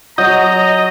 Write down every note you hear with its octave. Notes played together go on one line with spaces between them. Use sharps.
F#3 D#5 A#5 G6